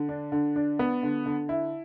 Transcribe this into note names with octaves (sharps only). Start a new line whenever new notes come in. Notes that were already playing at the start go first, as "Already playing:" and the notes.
Already playing: D3
D4
D3
D4
B3
D3
D3
E4